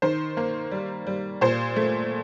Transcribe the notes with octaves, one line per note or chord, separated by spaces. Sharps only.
D#3 C5
A#3
G3
G3
A#2 C5
A3